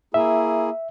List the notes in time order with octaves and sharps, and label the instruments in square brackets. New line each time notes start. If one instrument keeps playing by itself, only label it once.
[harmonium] A#3 E4 G#4 [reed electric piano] E5